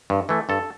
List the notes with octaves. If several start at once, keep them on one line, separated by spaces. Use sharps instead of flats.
G2
E3 A3
G2 A4